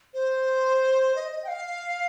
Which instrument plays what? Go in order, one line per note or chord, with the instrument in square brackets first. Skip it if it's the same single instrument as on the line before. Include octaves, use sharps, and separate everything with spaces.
[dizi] C5
D#5
D#5
G5
F5